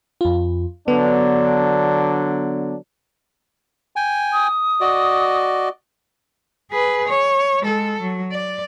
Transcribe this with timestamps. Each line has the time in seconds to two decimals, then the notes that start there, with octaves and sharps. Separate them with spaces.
0.21 F2 F4
0.88 D3 F#3 B3 D4
3.96 G5 G#5
4.33 D#6
4.81 F#4 D5 D#5
6.72 G#4 B4
7.08 C#5
7.61 G#3 A4
8.01 F#3
8.32 D5